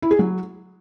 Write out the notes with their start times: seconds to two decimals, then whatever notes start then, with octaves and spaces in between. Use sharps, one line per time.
0.02 E4
0.11 G#4
0.19 F#3